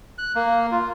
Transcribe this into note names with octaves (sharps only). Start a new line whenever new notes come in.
F#6
A#3
F4